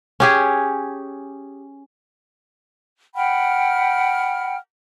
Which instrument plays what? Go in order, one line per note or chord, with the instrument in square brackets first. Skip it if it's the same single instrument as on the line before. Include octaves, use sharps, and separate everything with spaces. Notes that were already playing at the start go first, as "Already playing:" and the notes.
[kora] C#4 G4 G#4
[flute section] F#5 G5 B5 F6